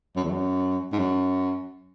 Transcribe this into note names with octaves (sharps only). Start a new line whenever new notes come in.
F#2
E2
F#2
G#2
F#2